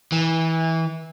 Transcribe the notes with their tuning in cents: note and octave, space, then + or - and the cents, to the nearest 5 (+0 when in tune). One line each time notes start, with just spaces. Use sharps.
E3 -20